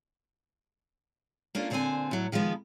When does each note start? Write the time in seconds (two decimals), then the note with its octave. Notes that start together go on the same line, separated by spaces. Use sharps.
1.55 A#3 C#4 D4 F4 A4
1.70 A#2 D3 C4 F#4 C5 G#5
2.11 A2 F#3
2.32 D#3 F3 G#3 B3